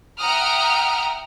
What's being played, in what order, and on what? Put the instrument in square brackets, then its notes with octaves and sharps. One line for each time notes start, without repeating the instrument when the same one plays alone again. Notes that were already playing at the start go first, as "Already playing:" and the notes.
[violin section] E5 F#5 G5 A#5 D#6 F6